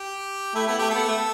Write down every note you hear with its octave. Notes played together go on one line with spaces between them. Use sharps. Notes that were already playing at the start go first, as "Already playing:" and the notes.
Already playing: G4
A3 E4
B3 E4
A3 G4
B3 A4
A3